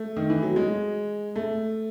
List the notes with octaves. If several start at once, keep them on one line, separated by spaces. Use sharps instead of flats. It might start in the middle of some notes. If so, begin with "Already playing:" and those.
Already playing: A3
D#3
E3
F#3
G#3
A3